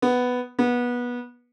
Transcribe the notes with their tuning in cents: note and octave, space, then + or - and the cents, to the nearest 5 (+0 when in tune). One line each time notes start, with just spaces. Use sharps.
B3 +5
B3 -20